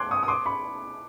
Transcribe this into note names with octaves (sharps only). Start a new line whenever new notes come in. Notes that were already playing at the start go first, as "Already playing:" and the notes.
Already playing: C6 D6 F#6 G#6
C#6 D#6
D#6
C6 D6
B5 C#6